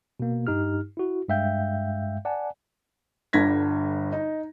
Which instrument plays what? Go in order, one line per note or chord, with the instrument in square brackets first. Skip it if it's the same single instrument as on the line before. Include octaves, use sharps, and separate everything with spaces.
[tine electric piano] B2 A#3
G2 D#4 G4 F6
E4 F#4
G2 G#3 E5 F5 G5 G6
D5 F#5 G#5 A5
[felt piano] G1 G2 D3 G#6 A#6 B6
D#4